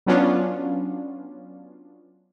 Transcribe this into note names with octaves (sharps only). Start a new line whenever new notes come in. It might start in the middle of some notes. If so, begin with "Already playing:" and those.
F#3 B3 C#4 D4 F4